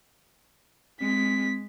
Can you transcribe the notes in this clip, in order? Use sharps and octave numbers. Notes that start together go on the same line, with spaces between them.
G#3 C4 B6